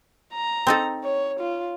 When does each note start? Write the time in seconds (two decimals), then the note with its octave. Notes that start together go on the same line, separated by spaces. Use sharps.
0.34 A#5
0.67 C4 D#4 A4
1.04 C#5
1.40 F4